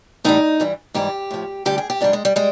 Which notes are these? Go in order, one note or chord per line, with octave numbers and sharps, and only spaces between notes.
A2 E3 G3 D#4
G2 E3 G3
G#2 E3 G3 G4
A2 F3
D2 D3 G3 G4
G#4
G4
G#2 E3 G3 D4
G#3
G3
G3 G#3